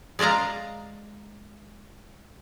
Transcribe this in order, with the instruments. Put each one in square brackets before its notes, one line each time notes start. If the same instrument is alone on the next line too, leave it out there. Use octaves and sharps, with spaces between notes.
[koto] G#3 D5 D#5 F5 A#5